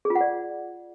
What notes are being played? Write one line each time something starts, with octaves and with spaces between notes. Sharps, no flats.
G#4
F4
F#5
D5